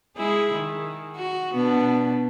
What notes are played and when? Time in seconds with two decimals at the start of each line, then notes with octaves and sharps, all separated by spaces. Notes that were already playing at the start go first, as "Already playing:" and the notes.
0.17 G#3 E4 G#4
0.54 D#3
1.16 F#4
1.53 B2 B3 D4